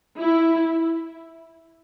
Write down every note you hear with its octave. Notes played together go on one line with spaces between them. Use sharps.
E4